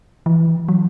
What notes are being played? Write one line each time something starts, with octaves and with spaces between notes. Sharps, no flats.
E3
F#3